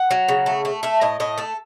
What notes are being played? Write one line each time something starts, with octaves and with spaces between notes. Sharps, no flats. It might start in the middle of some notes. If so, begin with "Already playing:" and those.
Already playing: F#5
F#3
C#3
A3
A3
A3 E5
A2 D#5
A2 D#5
A3 A4